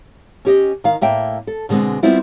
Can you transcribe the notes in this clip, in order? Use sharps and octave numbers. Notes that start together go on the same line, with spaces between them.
C#4 G4 D#5
D#3 F5
A2 A#3 E5 G5
A4
B2 D3 G#3 B3 C4
G3 B3 C4 E4 F4